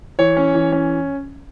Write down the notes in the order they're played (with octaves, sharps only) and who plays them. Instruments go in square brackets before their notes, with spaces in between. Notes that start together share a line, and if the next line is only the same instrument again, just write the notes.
[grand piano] E3 C#5
C#4
E3
C#4